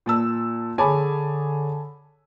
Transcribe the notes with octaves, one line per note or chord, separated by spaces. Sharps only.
A#2 A5 E6
D3 G#4 C#5 G#5 A5 B5 D6